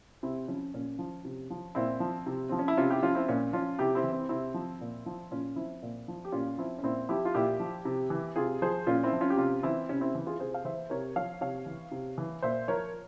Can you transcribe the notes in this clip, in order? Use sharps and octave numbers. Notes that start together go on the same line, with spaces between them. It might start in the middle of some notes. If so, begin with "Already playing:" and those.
C3 C4 E4
F3 C#4
A#2 C#4
F3
C3
F3
A#2 C4 E4
F3
C3
F3 C4
C#4
E4
C3 C#4 F4
E4 G4
F3 C#4 F4
C4 E4
A#2 C#4
F3 C#4 F4
C3 E4 G4
C4 E4
E3
C4
C3 C4 E4
F3
A#2
F3
A#2 C#4 F4
F3 C4 E4
A#2
F3
G4
A#2 C#4 F4
F3 C4 E4
C#4
A#2 C4 E4
F3 E4 G4
F4
A#2 E4 G4
F3
C3
E3
C3 F4 G#4
F3 G#4 C5
A#2 C#4 F4
C4 E4
F3
C#4 F4
G4
C3 C#4 F4
E3 C4 E4
C3 C#4
C4 E4
E3
F4 G#4
C3 G#4 C5
F5
E3 C5 E5
C3 A#4 C#5
F3 C#5 F5
C3 C#5 F5
E3
C3
E3
A#2 C5 E5
F3 A#4 C#5